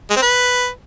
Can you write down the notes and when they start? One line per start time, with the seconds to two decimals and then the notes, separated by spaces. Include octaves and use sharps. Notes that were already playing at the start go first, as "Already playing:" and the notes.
0.10 G#3
0.16 C4
0.22 B4